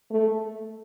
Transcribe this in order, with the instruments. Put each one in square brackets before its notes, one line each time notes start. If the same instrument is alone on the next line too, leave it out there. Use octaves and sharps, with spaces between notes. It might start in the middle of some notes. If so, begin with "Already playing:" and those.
[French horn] A3